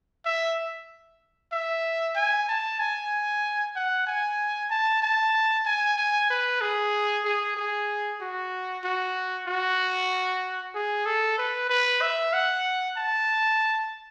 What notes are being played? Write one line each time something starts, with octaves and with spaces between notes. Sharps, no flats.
E5
E5
G#5
A5
G#5
F#5
G#5
A5
A5
G#5
G#5
B4
G#4
G#4
G#4
F#4
F#4
F#4
G#4
A4
B4
B4
E5
F#5
A5